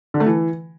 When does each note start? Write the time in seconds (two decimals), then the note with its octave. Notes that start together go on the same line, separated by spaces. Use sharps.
0.14 D3
0.20 A3
0.26 E3